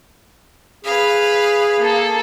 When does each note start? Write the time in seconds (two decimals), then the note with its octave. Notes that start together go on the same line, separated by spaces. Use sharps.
0.85 G#4 B4 F5
1.78 A#3 A4